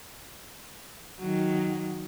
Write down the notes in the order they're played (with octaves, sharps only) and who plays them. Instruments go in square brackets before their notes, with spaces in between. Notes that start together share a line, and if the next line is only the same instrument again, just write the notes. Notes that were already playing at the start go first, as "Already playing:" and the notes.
[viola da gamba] D#3 F#3